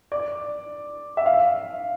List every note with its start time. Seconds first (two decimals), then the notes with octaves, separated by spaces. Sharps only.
0.12 D5
1.17 E5
1.26 F5